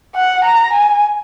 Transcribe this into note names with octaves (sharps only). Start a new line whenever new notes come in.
F#5
A#5
G#5